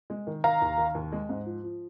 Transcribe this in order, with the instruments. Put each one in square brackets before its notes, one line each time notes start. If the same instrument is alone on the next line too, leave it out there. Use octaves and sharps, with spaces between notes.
[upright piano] G#3
D#3
[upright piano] D#3 [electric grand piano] F5 A#5
[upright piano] D#2
D#3
D#2
G#3
G#2
F3
F3